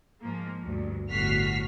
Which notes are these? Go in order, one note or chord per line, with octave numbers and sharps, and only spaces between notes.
G#2 F3 A#3
D2 G2
G1 A2 F#4 F6 B6 C7